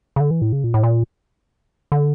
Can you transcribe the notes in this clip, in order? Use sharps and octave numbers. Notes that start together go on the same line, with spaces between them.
C#3
D3
E3
A2
C#3
A#2
A2
A#2
D3